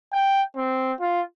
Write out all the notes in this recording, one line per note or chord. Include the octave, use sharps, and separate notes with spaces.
G5
C4
F4